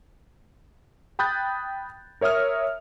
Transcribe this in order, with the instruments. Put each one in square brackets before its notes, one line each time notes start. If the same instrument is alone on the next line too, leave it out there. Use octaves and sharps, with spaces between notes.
[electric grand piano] G5 B5 D#6 F#6 G6 A6
A#4 C#5 E5 D#6 F6